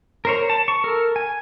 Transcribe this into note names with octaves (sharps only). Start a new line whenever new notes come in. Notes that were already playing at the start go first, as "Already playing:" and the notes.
A#4 C5 C#5
A5
C#6
A4 A#4
G#5